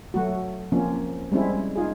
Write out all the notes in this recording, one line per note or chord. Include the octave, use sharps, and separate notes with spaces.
F#3 A3 F#4
F3 A#3 C4 C#4
G3 G#3 C4 C#4 E4
D#4 F4 G#4